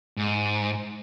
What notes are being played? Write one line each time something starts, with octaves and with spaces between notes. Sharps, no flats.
G#2